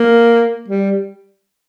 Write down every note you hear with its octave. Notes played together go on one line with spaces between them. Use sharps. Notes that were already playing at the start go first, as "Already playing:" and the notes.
Already playing: A#3
G3